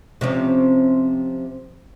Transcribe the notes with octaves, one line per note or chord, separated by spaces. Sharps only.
C3 F3 C#4